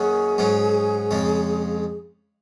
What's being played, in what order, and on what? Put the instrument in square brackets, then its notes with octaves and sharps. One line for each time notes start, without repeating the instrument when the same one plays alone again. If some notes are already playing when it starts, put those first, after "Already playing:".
Already playing: [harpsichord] F#2 D#3 A#3 C#4 F#4 [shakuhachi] G#4
[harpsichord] G#2 F#3 C#4
F2 C#3 G#3